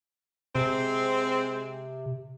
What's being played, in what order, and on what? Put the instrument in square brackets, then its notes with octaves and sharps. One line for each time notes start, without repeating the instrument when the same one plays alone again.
[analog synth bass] C3 [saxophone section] G#3 C4